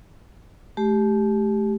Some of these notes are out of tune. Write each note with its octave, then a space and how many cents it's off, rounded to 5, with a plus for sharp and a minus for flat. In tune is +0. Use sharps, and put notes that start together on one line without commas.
A3 -35 G4 +0